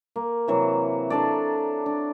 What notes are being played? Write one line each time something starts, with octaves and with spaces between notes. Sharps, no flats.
A#3
C3 E3 F#3
D4 A4 D5
D4